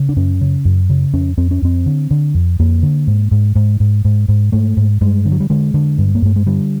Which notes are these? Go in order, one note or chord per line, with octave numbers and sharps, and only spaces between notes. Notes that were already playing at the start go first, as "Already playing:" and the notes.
Already playing: C#3
D4
F#2 C#4
C#3
F#2
C#3
F2 C#4
F2 C4
C#4
F2 C4
D3
D3
F2
F2 A#3
D3
G#2
G#2
G#2
G#2
G#2
G#2
G#2 A3
G#2
G2 G#3
D3
F#3
G3
D3 G#3
D3
G2
A#3
G2 A3
G#3
D3 G3